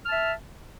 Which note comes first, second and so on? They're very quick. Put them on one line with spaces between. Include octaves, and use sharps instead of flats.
F6 A5 E5